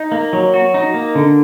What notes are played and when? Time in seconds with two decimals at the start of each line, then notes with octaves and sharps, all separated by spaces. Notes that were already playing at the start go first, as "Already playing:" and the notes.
Already playing: D#4
0.12 A#3
0.33 F#3
0.54 F#4
0.74 D#4
0.94 A#3
1.15 D3